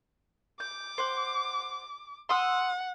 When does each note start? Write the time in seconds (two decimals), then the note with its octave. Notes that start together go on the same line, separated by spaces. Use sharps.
0.60 D6 G6
0.98 C5 F#5
2.29 F#5 C6 D#6 E6